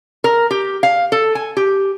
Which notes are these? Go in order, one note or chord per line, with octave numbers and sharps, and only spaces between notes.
A#4
G4
F5
A4
G#5
G4